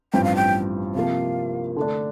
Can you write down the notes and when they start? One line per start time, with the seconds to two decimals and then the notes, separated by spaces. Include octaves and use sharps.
0.13 A1 G2 F3 C4 G5
0.24 F5
0.36 G5
0.95 C3 F3 A#3 F5
1.76 D3 A3 D4